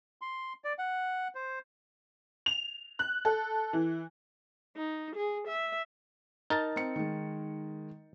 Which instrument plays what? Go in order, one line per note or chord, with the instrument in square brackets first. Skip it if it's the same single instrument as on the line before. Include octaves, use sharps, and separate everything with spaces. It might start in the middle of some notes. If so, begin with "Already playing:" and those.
[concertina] C6
D5
F#5
C5
[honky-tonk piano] F7
F#6
A4
E3
[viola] D#4
G#4
E5
[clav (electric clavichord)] D#4 A#4 A5 [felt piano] A6
[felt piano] C4 C#7
D#3 G#3